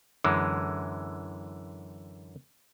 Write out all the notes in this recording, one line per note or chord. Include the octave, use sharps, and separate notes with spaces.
F#2 D3 E3 G#3